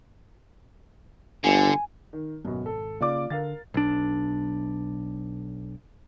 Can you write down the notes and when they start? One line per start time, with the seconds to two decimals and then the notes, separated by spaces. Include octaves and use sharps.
1.44 G1 D3 G#5
2.13 D#3
2.45 G#1 F#2 B2
2.66 A4
3.00 C#3 A#3 F4 D5 D6
3.30 D3 A#4 F5 A6
3.74 B1 D4